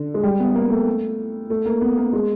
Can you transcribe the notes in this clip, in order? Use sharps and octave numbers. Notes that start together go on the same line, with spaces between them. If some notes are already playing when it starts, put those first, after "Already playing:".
Already playing: D3
G#3
G3
B3
A#3
A3
A3
A#3
B3
A#3
G#3